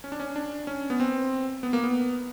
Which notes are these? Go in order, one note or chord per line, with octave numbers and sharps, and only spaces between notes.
C#4
D4
C#4
D4
C#4
B3
C4
B3
A#3
B3